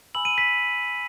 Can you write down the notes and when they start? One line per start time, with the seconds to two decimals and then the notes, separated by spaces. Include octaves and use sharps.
0.15 G#5 B5 E6 F#7
0.25 D#7
0.38 B6